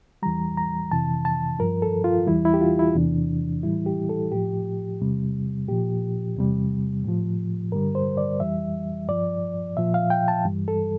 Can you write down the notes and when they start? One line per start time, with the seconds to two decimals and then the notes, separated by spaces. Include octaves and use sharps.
0.22 E2 E3 G3 A#5
0.57 A#5
0.92 F2 C3 E3 A5
1.25 A5
1.59 G2 F3 A#4
1.82 A4
2.04 F4
2.27 E2 E3 G3 E4
2.45 E4
2.54 G4
2.61 F4
2.79 E4
2.96 E2 C3 E3 D4
3.63 A2 E3 G3 E4
3.86 G4
4.09 A4
4.32 A2 F3 G4
5.00 E2 C3 G3
5.68 A#2 F3 G4
6.36 E2 C3 G3
7.04 A2 F3
7.72 G2 D3 G3 A#4
7.95 C5
8.17 D5
8.40 F2 E3 G3 E5
9.08 G2 F3 D5
9.77 A#2 F3 E5
9.94 F5
10.10 G5
10.28 A5
10.45 G2 E3 G3
10.68 A4